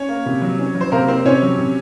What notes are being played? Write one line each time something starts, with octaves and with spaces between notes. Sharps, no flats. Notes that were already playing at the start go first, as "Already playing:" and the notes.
Already playing: C#4 C#5
A#3
C3
F#3
C#4
F#3
C5
C3 A#3 A#4
C4 C5
C3 C#4 C#5
F#3
C3